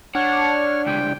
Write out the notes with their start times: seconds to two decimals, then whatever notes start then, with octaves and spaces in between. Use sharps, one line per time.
0.15 D4 C#5 F#5 F6
0.86 C#2 C3 G5